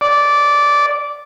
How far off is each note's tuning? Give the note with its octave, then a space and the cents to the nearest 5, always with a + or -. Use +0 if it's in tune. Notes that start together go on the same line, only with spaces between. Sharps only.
D5 -10